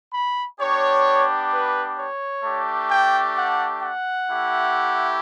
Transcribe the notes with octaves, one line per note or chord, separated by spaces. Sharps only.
B5
B3 D4 G4 C#5
B4
C#5
A3 D4 G4
G5
F#5
F#5
A3 E4 G4